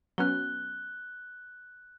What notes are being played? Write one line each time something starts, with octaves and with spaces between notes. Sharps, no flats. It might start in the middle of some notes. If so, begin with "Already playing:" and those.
F#3 B3 C#4 F#6 G7